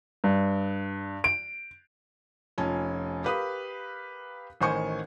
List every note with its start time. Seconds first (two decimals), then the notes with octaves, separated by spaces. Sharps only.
0.24 G2
1.24 D7
2.58 F1 C#4 F4 G#5 A5
3.24 G4 A#4 B4 F5 D#6
4.61 A1 D#3 C5 G#5 C#6 C#7